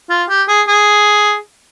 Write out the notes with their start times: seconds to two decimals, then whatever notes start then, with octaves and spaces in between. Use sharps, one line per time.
0.10 F4
0.29 G4
0.48 G#4
0.68 G#4